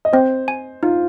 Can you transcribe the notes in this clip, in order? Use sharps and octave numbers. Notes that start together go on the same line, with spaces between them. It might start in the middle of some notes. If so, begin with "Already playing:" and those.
D#5
C4 C5
G#5
D#4 F4